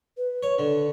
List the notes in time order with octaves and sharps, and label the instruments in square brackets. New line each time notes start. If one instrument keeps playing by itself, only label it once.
[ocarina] B4
[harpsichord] C#5
[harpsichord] D3 [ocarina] D4